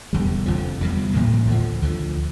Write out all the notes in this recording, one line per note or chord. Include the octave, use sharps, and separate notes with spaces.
E1 E2 D3 G3
F1 F2 D3 F3
E2 C3 G3
A1 A2 F3 A#3
D2 D3 F3
D2 D3 F3